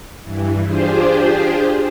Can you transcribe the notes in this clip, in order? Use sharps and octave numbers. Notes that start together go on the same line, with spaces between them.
G2 E3
D4 F4 G4 G#4 C5